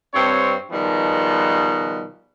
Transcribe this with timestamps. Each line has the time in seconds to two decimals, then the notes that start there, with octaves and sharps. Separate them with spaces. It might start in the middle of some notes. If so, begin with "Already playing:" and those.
0.14 G2 C4 C#5
0.71 B2 D#3 F3 G3 G#3 B3